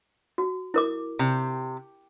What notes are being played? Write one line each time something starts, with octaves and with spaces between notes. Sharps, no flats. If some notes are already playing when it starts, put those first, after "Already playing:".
F#4
E4 A#4 D6
C3